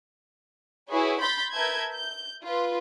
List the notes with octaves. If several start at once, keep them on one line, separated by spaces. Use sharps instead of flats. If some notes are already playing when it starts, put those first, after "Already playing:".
E4 F#4 G#4 B4 C#5
B5 C6 G6 A6 B6
A#4 B4 E5 A5 G6 G#6
G6
F4 B4